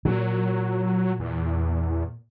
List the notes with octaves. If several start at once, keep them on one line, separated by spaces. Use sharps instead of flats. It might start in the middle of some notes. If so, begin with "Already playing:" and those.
A#2 F#3
E2